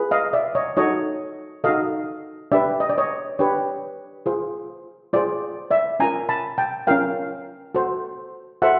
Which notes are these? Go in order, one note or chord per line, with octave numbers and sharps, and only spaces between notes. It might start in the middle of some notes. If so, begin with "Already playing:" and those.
Already playing: F4 G#4 B4
D#5 F5
D5 E5
C#5 D#5
D#4 F#4 A4 C#5 D#5
D#4 F#4 A4 D#5 F5
D4 G4 B4 D5 E5
D#5
D5
C#5 D#5
D4 G4 B4 C#5
F4 G#4 C5
F4 G#4 C5 D5
D5 E5
C#4 F4 A#4 G#5 A#5
A5 B5
G5 A5
C#4 F4 A#4 F5 G5
F#4 A4 C5
F#4 A4 C5 E5 F#5